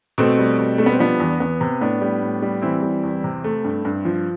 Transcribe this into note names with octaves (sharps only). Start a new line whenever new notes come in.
B2 A3 C4
G3
B2
G3 A3
B3
C4
F3 B3 D4
E2
E2 B3
C3
A2 B3 D4
G3
A2
G3
E3 C4 E4
G3
E2
C3
A3
G2
G2
F3